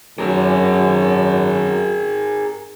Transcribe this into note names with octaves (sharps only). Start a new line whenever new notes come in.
F#2 G#4 A#4